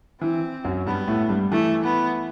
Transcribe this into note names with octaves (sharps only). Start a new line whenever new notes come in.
E3 C4
F#2 F#3
G2 G3 B3
A2 A3
G2 G3
E3 A3
B3